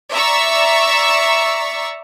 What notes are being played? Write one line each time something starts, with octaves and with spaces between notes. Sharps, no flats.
D5 E5 A#5 C#6 E6